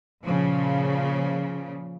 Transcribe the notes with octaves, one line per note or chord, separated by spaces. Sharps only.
A#2 C#3 F3